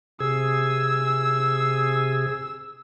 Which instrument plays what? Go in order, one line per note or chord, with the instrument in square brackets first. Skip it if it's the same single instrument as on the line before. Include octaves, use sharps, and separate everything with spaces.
[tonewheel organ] C3 G#4 [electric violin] E6